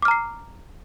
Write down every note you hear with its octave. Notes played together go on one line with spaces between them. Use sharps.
A#5 D6 F6 C7